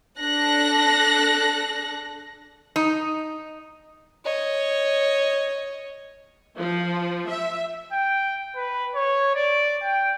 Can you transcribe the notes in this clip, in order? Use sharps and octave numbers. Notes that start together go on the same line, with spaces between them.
D4 A4 F#6 A#6
D#4
C#5 D#5
F3
E5
G5
B4
C#5
D5
G5